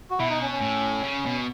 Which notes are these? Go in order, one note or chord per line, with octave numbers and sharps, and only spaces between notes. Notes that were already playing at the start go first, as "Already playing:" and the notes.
F#4
B2 E4
D#4
C#4
C#4
A2
C#3
B2